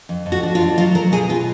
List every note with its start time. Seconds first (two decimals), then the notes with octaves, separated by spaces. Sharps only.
0.09 F2
0.26 F2
0.32 F#4
0.43 D4
0.55 F4
0.61 F2
0.78 F#3 F4
0.95 F#3 A#4
1.12 B2 G#4
1.29 B2 F4